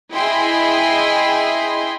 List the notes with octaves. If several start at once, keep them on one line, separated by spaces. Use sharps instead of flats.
E4 G#4 D#5 G5 G#5 C6